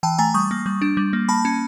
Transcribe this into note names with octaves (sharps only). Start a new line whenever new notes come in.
E3 G5 A5
A3 G#5 A#5
G3 C#6 D#6
A#3
G3
D4
G3
A#3
A#3 A5 B5
C#4